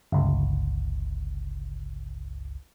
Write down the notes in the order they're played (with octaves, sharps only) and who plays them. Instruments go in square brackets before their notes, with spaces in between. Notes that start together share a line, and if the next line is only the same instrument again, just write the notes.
[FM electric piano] G1 C#2